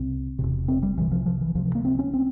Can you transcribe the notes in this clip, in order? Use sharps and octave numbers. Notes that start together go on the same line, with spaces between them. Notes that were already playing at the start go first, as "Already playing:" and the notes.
Already playing: C2 C3 C4
E1 E2 C3
C4
G3
C2 C3 E3
F3
F3
E3
C#2 C3 F3
F3
A#3
C4
C#4
C4